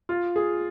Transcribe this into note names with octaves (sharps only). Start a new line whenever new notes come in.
F4
G#4